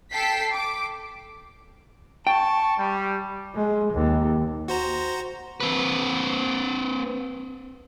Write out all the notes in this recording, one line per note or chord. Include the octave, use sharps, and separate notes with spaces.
A4 G5 A5 B6 C7
D6
G5 A5 C#6
G3
G#3
D#2
F#4 C5 A#5
C4 B4